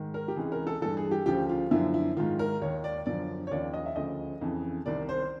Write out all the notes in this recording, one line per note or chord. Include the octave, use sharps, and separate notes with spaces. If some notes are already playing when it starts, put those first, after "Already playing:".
Already playing: G#2 D#3
A#4
G4
C#2 C3 E3 G#4
A#4
A4
G2 E3 A4
G#4
G4
D2 C#3 F3 G4
F4
F#2 D3 F3 E4
E4
G#2 D#3 F4
A#4
D#2 D#3 C#5
D5
F#2 D3 F3 D5
C#5
D#2 C#3 F3 D5
D#5
E5
D2 C#3 F3 D#5
F2 C#3 E3
C2 C3 D#3 D5
C5